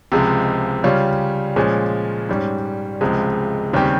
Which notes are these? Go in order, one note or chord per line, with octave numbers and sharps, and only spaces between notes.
C#2 C3 F3 G#3
C#3 G3 C#4 F4
A#2 F3 G#3 C#4
G#2 G3 C#4
C#2 C3 F3 G#3
D#2 C#3 G3 C4 G4